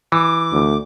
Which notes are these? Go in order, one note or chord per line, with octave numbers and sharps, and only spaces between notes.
E3 D6
D2